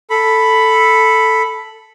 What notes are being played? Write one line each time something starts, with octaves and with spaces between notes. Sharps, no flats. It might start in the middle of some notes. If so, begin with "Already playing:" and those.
A4 B5